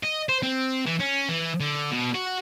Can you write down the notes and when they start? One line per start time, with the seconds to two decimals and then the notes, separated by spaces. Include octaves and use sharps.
0.03 D#5
0.29 C5
0.43 C4
0.86 E3
1.00 C#4
1.29 E3
1.60 D3
1.91 B2
2.15 F#4